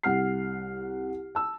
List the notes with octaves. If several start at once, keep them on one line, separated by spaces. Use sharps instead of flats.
C2 F#5 F6 C7
A5 E6